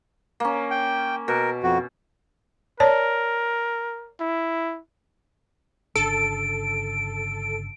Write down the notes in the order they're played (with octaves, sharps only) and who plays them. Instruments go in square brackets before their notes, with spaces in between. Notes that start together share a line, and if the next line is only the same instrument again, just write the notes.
[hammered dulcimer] A#3 C#4
[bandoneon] G5
[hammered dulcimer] B2 [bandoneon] A#4
[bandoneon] F2 F#4
[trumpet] A#4 [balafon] C#5 D5 A5
[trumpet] E4
[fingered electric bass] G1 C#3 D4 [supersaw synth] A4 [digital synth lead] D7